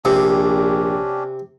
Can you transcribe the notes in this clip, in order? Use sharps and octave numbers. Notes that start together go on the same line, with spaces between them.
A#1 C3 C#4 D4 G4